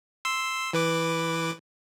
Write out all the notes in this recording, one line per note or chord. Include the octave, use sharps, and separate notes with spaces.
C6 E6
E3 B4 D6